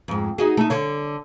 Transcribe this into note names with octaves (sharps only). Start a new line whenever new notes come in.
F2 G#2
D#4 F#4 G#4
A3 D#4
D3 C#5